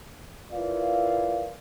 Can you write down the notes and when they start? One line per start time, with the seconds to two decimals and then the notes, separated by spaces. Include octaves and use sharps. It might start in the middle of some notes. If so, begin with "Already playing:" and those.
0.52 E4 F4 A#4 B4 D5 F5